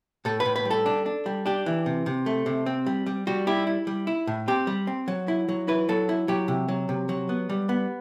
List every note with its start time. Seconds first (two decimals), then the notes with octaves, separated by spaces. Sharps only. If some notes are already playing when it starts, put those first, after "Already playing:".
0.25 A2 A4
0.40 B4
0.45 A2
0.56 B4
0.65 G3
0.71 A4
0.86 D4
1.06 D4
1.26 G3
1.46 D4 G4
1.66 E3
1.86 C3
2.06 C3
2.26 A3
2.46 C3
2.66 C4
2.86 G3
3.06 G3
3.27 G3 F#4
3.47 E4 G4
3.67 E4
3.87 G3
4.07 E4
4.27 A2
4.48 C4 G4
4.67 G3
4.87 C4
5.08 F#3
5.28 E4
5.49 F#3
5.68 E4 B4
5.89 F#3 A4
6.09 E4
6.28 F#3 G4
6.48 C3
6.68 F#3
6.89 C3
7.09 F#3
7.29 B3
7.49 G3
7.69 B3